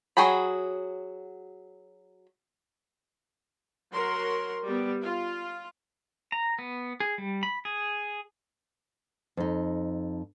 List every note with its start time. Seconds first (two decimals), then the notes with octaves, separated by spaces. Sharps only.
0.17 F#3 F#4 G#4 G5 B5
3.93 F#3 F#4 A#4 C6
4.66 G3 B3
5.05 F4
6.32 A#5
6.59 B3
7.00 G#4
7.18 G3
7.43 B5
7.65 G#4
9.37 F2 D#4